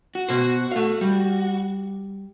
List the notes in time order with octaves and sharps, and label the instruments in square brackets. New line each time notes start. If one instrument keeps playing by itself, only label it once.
[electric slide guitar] F#4
[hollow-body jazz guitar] B2 C5
A3 F5
G3